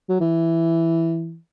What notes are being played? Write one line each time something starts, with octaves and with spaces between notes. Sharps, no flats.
F#3
E3